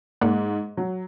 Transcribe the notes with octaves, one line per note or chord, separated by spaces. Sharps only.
G#2 A#3 D5 F#5
F#3